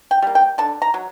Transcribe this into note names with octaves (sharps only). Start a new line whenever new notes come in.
G5
G3 A#3
G5
D3 A5
A#5
F#3